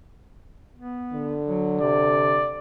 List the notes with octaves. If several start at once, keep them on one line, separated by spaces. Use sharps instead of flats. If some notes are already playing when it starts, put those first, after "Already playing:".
B3
D3
F#3
C3 D5